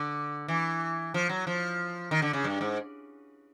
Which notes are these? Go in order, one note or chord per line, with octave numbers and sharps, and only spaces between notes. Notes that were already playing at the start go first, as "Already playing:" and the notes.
Already playing: D3
E3
F3
F#3
F3
D#3
D3
C#3
G2
G#2